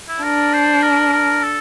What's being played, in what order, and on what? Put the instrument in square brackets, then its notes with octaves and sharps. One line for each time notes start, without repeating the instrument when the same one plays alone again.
[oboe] E4
[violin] D4 [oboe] A#4
[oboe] C5
A#4
A#4
A4